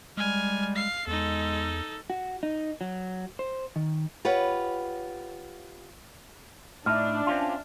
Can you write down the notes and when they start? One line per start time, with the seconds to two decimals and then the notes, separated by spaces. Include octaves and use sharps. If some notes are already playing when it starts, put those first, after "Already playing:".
0.17 G3 G#3 G#5 F6
0.76 F5 C7
1.07 E2 G#3 D#4 A4
2.10 F#4
2.43 D#4
2.81 F#3
3.39 C5
3.76 D#3
4.25 F4 G4 B4 C#5 F#5
6.86 A2 D4 D#4 E5 F6
7.27 C4 C#4 F4